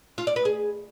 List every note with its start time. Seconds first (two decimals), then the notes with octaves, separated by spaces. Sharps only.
0.18 F4
0.27 D5
0.36 B4
0.45 G#4